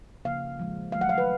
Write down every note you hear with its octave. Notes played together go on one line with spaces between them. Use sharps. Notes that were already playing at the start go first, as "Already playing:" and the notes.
C#3 F3 A#3 F5
A#2 F3 G#3
D#3 F#3 A3 F5
F#5
F5
B4